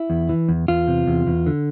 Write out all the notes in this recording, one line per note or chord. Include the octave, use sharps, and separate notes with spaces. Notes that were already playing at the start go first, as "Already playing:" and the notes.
Already playing: E4
E2
E3
E2
E2 F4
C3
E2
E2
D3